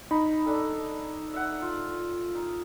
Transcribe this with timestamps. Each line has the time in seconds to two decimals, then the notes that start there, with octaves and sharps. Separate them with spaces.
0.11 D#4 B5
0.46 D4 A4
1.34 E5 F#5
1.62 F4
2.35 D#4